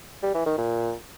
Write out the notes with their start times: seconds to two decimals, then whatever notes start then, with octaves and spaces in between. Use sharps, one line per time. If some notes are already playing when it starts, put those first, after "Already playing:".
0.23 G3
0.34 E3
0.46 D#3
0.58 A#2